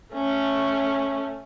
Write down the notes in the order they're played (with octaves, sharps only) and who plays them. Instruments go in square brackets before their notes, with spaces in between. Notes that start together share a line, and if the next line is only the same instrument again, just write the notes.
[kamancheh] A3 C#4